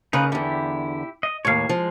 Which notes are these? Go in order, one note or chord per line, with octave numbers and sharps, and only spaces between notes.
C#3 A#3 D#4 B4
E2 D3 E4 G4
D#5
D#2 A2 C#5 F5
F3 G#3